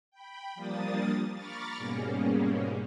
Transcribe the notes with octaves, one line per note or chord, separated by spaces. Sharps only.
G5 B5
F3 G3 A#3 D4 D#6 A6
A#5 B5 C#6 D6 F6 A6
G#2 B2 G3 G#3 A#3 C#4